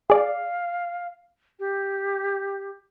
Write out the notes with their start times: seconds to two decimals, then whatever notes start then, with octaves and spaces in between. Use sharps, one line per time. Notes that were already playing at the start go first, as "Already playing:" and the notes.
0.10 G#4 D5 F5
1.60 G4